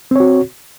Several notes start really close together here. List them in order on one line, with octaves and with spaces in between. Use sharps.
C4 C#5 F#4